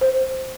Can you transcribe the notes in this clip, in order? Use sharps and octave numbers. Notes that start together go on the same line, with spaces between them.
C5